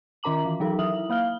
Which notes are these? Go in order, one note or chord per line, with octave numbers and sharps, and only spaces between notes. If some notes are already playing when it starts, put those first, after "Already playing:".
D#3 C#4 A#4 A#5 D6 F#7
E3
E3 F#3 D#4 A4 A#4
E4 E5 D#6 F#7
A#3 F5 F6 G7